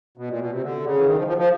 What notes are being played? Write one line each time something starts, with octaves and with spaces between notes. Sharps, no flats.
B2
A#2
B2
C3
D3
C#3
E3
D#3
F3
F3
F3